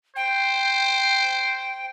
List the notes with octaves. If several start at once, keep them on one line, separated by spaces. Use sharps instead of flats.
C5 G5